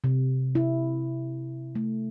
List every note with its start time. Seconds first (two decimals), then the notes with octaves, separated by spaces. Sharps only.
0.04 C3
0.55 E4
1.75 A3